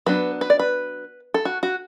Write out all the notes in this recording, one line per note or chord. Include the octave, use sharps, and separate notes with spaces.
F#3 B3 D4 B4
B4
D5
B4
A4
F#4
F#4